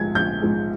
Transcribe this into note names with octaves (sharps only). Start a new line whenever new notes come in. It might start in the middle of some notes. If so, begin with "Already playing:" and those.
Already playing: A#1 G#2 F3 G#3 G#6
A#1 G6
G#2 F3 G#3